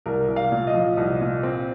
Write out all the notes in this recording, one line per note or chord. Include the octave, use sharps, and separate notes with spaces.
C2 A#4
C2
F5
A#2
D#5
F3
C2
A#2
C4